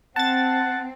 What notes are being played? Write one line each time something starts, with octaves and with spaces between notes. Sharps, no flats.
C4 F#5 A5 A6